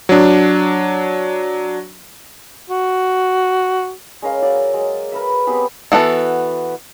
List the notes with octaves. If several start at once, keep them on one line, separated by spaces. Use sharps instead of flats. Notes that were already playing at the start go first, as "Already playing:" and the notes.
F#3 D4
F#4
G#3 C#4 A#4 F5
F#3 D5 E6
F#3 G#3
A#4 B4 E5
B3 C4 G4 G#4
E3 B3 F#4 A4